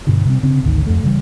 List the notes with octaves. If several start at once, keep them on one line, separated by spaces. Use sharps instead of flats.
G2 B2 D3
C3 G3 C4
C#3 C4 D4
G#1 D2 D#3
F2 A3
C#3 E3 F3 G3